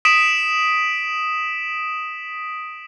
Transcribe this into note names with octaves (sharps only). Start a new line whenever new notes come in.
D#6 B6 D7 E7